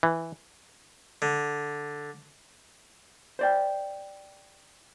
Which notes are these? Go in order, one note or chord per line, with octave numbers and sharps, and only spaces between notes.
E3
D3
C5 D5 G5